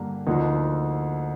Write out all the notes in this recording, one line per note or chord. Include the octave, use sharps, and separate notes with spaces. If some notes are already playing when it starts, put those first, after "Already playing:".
Already playing: G2 D3 G3 A#3
D2 D3 F3 A#3 D#4